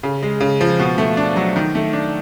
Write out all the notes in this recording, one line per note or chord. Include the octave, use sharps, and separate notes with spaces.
C#3
G#3
C#3
F3
B2
A3
D4
F#3
D#3
A3
D4